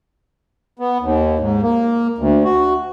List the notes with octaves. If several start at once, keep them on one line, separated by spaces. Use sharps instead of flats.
B3
D#2
G#2
A#3
D2
F#4